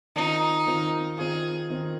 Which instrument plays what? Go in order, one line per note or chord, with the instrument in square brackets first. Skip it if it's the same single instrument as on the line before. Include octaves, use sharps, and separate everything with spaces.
[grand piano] D#3 C4 F4 [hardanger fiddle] D#4
[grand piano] D#3 C4 F4
[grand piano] D#3 C4 F4 [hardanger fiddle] G#4
[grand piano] D#3 C4 F4